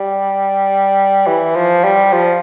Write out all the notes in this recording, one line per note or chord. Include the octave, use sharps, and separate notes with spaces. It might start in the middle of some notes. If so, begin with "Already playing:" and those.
Already playing: G3
E3
F3
G3
F3